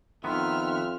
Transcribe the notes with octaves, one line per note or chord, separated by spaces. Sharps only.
F2 D#3 B3 E5 C6 F6